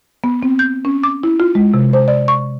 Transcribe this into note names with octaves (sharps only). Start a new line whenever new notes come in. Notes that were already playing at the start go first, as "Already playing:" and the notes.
B3
C4
G6
C#4
D6
E4
F4
G#3
C3
C5
D5
C#6